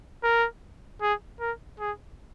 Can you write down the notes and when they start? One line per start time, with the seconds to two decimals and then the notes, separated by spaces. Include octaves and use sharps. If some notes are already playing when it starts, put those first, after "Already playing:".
0.23 A#4
1.02 G#4
1.40 A#4
1.79 G#4